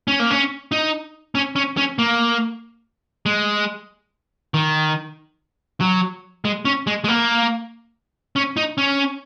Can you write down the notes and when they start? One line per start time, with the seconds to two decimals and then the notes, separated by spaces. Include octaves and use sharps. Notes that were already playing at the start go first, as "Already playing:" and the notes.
0.08 C#4
0.20 A#3
0.31 C#4
0.72 D#4
1.35 C#4
1.56 C#4
1.77 C#4
1.99 A#3
3.26 G#3
4.54 D#3
5.81 F#3
6.45 G#3
6.65 C#4
6.87 G#3
7.04 G#3
7.08 A#3
8.36 C#4
8.57 D#4
8.78 C#4